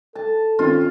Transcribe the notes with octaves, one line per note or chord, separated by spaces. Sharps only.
A4 A5
D#3 C4 C#4 F4